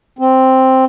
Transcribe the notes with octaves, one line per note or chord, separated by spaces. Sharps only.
C4